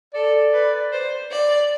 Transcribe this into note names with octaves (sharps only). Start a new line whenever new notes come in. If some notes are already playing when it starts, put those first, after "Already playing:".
A4 D5
B4
C5
D5